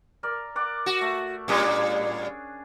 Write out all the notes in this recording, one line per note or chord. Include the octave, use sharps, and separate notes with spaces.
A#4 D5
D5 F#5 D6
F#4
A3
A2 G3 A#3 C#4 D4 G#4